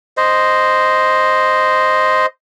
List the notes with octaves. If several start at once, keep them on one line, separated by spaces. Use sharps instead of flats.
C5 D#5